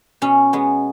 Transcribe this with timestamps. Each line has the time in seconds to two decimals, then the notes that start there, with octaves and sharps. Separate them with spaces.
0.22 B2 C#4
0.53 G#3 B3